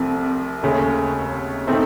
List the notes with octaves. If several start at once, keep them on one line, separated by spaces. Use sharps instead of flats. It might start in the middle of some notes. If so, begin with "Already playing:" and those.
Already playing: C2 C3 F3 A3 C4
D#2 C#3 A3
A#2 A3 C4 D#4